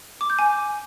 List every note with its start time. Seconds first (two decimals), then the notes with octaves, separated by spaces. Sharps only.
0.21 D6
0.30 G6
0.39 G#5